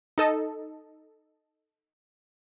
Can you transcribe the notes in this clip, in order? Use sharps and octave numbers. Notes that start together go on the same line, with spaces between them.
D#4 A4 D#5